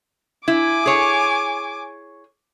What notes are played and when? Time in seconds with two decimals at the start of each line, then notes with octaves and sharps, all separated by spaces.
0.48 E4 G#5 D6
0.86 G#4 C#5